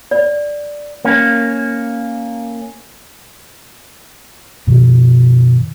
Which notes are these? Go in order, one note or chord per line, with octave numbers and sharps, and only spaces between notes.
D5
A#3 C#4
F#2 B2 D#3 F3